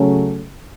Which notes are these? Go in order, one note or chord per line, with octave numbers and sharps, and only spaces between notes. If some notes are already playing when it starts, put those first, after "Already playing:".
Already playing: C#3 F#3 A3 C#4